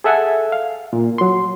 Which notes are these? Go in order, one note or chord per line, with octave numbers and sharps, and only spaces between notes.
G#4 A4 E5 F#5 G#5
F5
A#2
F#3 C6